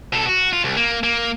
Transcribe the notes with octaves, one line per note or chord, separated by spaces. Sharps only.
B2 A4
F#4
F4
C2
A#3
A#3